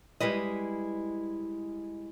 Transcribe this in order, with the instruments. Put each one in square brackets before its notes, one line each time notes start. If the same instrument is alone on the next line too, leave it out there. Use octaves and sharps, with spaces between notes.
[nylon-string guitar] G3 G#3 E4 B4 D#5